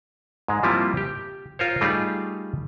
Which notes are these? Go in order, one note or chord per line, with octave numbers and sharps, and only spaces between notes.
G#2 G#3
F3 G3 A#3 C4 E4 F4
G4
F4 A#4 C5 C#5
G3 A3 D#4 F4 G4 G#4